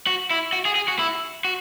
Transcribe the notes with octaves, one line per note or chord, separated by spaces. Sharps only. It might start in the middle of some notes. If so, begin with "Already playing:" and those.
F#4
E4
F#4
G#4
G#4
F#4
E4
F#4